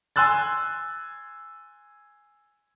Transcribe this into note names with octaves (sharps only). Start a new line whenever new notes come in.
G#5 C6 E6 F#6 A6